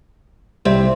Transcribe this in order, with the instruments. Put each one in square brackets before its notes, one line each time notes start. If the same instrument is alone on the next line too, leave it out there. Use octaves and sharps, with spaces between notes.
[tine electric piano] C2 G3 E5 [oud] C4